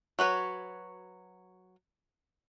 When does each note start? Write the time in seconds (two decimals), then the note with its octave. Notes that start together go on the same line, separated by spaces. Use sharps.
0.19 F#3 F#4 B4 C#5